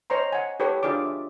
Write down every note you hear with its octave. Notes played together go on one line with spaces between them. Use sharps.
C5 C#5 D#5 A#5 C6
F#5 G#5
G4 A4 B4 C#5
D4 F4 G#4 D5 D6
E5